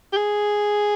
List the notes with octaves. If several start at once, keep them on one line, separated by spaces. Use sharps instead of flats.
G4
G#4